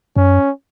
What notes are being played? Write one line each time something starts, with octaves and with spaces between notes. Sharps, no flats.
F#2 C#4